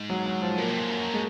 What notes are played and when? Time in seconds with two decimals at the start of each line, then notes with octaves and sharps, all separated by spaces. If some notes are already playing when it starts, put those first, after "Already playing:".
Already playing: G#2
0.10 F#3
0.26 F#3
0.42 F3
0.58 A#2 A#3
0.69 C3
0.79 G#2
0.90 F#2
1.14 G#3